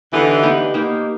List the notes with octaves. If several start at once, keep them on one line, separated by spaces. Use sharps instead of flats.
D3 E3 B3 D#4 G4 B4
B3 D#4 G4 B4
A#3 D#4 G4 C5